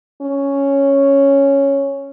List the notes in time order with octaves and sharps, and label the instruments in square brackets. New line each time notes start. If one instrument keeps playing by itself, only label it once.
[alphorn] C#4